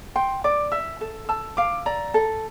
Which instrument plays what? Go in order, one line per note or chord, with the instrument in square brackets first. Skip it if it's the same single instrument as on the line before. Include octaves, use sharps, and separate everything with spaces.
[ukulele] G5 [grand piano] C6
[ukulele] D5 [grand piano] D6
[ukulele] E5 [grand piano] E6
[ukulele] A4
[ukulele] A5 [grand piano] E6
[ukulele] F5 [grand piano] D6
[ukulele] D5 [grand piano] A#5
[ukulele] A4